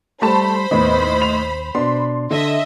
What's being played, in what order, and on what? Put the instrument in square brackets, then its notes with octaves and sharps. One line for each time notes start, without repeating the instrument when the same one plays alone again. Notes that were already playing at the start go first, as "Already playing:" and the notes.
[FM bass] G3 [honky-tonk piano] A3 A5 [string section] C5 B5
[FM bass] D#2 [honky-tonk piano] A2 D#4 [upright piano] B3
[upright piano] F7
[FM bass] B2 [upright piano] D4 [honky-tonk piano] C6
[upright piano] D3 [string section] D#5 E5